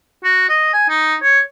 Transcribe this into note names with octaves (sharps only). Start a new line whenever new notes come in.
F#4
D#5
G#5
D#4
C#5